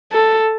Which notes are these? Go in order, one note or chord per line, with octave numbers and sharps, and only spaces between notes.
A4